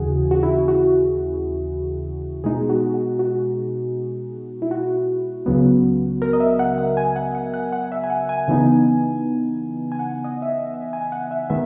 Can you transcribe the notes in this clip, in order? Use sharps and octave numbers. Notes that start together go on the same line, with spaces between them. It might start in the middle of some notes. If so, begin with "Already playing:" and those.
Already playing: D#2 C#3 E3 F#4 G#4
F#4
E4
F#4
B2 G#3 D#4 G#4
F#4
F#4
F#4
E4
F#4
C#2 C#3 F#3 B3
A#4
D#5
E5
F#5
F#5
G#5
F#5
F#5
F#5
F#5
E5
G#5
F#5
G#5
C#3 E3 B3 D#4
G#5
F#5
D#5
E5
D#5
E5
G#5
F#5
E5
D#3 G#3 B3 E5